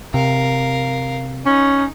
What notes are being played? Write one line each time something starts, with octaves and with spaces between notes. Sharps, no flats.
C3 A#4 F5
C#4 D#4